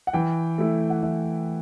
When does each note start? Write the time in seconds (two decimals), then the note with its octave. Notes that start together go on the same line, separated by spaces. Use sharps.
0.07 F#5
0.14 E3 G5
0.58 A3 E4
0.90 F#5
1.03 E3 E5